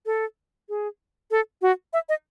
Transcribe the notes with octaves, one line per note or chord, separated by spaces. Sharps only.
A4
G#4
A4
F#4
E5
D#5